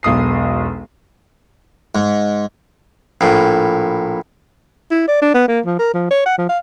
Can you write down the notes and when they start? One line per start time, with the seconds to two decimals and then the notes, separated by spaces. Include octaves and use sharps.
0.03 E1 B1 D#6 C7
1.95 G#2
3.21 A#1 A2
4.91 E4
5.08 D5
5.22 D4
5.34 B3
5.48 A#3
5.65 F3
5.79 A#4
5.93 F3
6.10 C#5
6.26 F#5
6.38 F3
6.49 F5